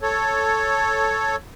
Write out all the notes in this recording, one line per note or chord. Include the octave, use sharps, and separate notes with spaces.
A4 C#5